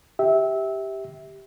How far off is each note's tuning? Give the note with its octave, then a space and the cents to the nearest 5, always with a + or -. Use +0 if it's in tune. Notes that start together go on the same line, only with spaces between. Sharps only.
G4 +0 E5 -20